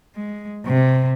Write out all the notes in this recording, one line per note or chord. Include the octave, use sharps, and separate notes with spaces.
G#3
C3